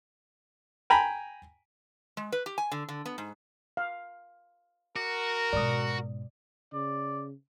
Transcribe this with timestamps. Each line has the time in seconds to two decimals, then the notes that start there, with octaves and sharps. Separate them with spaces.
0.90 G5 G#5 A#5 B5
2.17 G#3
2.32 B4
2.46 G4
2.58 G#5
2.72 D3
2.89 D3
3.06 B3
3.18 G#2
3.77 F5
4.96 F#4 A#4 D6
5.53 G#2 B2 D5 D#6
6.73 C#3 D5